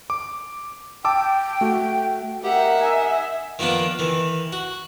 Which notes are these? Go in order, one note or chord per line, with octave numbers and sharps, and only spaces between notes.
D6
G5 A5 D6 E6
A3 F#4
D#4 G4 A#4 E5 F#5
G#5
D#3 F3 A#3 B3 D4
D#3 E3
F#4